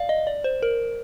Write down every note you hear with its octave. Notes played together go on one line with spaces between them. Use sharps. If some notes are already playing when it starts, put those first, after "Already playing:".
Already playing: D5 F5
D#5
D5
C5
A#4